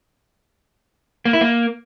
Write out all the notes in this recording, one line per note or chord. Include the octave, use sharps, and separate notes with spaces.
A#3
E4
A#3